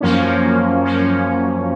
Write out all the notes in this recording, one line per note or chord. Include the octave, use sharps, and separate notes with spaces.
F#2 F3 A#3 C#4
F#2 F3 A#3 C#4